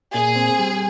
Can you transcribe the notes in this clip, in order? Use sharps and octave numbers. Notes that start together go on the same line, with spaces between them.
A#2 G#4
C4
G3